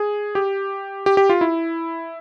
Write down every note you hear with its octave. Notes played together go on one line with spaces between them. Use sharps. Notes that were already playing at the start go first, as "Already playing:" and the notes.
Already playing: G#4
G4
G4
G4
F4
E4